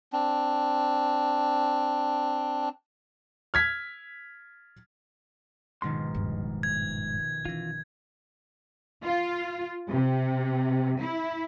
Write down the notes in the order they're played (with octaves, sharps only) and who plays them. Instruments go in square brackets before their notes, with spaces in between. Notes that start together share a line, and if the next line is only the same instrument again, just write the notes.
[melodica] C4 D4
[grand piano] F6 G#6 B6
[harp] A#1 B2 D#3 [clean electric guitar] G#2 C6
[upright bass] D#1 G2
[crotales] G#6
[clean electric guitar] E3 F4 [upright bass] C#4 D#4
[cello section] F4
C3
E4